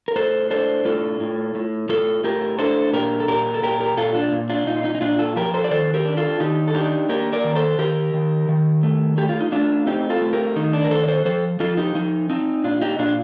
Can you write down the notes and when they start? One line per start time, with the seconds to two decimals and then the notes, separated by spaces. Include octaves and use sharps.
0.08 A#4
0.16 A2 A4 C5
0.51 D4 A4 C5
0.85 A2 F4 A4
1.20 A2
1.55 A2
1.89 A2 F4 A4
2.24 A2 G4 A#4
2.59 D4 A4 C5
2.93 A#2 G4 A#4
3.20 A4
3.28 A#2 G4 A#4
3.54 A4
3.63 A#2 G4 A#4
3.80 G4 A#4
3.97 A#2 F4 A4
4.15 D4 F4
4.32 A#2
4.50 D4 F4
4.67 A#2 D#4
4.76 F4
4.84 D#4
4.95 D#4
5.01 A#2 D4 F4
5.19 F4 A4
5.36 F3 G4 A#4
5.54 A4 C5
5.64 D5
5.71 D#3 A4 C5
5.94 G4 A#4
6.05 D4
6.17 F4 A4
6.40 D#3 D#4 G4
6.68 A4
6.75 D4 D#4 G4
7.09 A#3 G4 A#4
7.33 A#4 D5
7.44 D#3
7.55 A4 C5
7.78 D#3 G4 A#4
8.14 D#3
8.49 D#3
8.83 A3
9.18 A3 G4
9.29 F4
9.41 D#4
9.52 A3 D4 F4
9.87 C4 D#4 G4
10.10 F4 A4
10.21 A3
10.33 G4 A#4
10.56 D#3 D#4
10.73 D4
10.84 A#4
10.91 D#3 A4 C5
11.03 D5
11.08 A4 C5
11.25 F3 A4 C5
11.60 F3 F4 A4
11.77 D#4 G4
11.95 F3 D#4
12.30 C4 D#4
12.64 A#2 D4 F4
12.81 D#4 G4
12.99 A#2 D4 F4